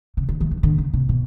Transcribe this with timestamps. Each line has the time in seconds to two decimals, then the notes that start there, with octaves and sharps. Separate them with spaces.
0.17 C#3
0.29 D3
0.41 E3
0.51 D#3
0.63 D3
0.78 C#3
0.94 C3
1.09 B2